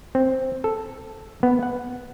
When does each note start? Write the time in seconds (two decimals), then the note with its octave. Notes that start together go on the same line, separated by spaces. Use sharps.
0.15 C4
0.64 A4
1.43 B3
1.63 F#5